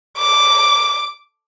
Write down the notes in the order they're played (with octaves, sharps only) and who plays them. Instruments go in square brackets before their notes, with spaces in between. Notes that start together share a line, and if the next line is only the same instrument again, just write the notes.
[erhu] D6